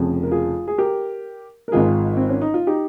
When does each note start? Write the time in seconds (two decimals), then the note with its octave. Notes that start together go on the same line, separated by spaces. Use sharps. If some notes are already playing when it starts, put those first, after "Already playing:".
Already playing: F1 F2 C#3 F3
0.23 A#4
0.31 F4 G#4
0.68 G#4
0.78 G4 A#4
1.68 A#4
1.72 G#1 G#2 D#3 F4 G#4
2.17 C4
2.29 C#4
2.41 D#4
2.54 F4
2.67 D#4 G4